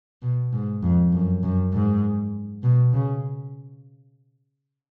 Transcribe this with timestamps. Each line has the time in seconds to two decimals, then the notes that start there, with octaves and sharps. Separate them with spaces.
0.22 B2
0.53 G#2
0.83 F2
1.13 F#2
1.43 F#2
1.73 G#2
2.63 B2
2.93 C#3